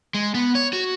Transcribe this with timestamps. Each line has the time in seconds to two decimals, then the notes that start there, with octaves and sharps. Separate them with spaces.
0.14 G#3
0.35 B3
0.55 C#5
0.73 F#4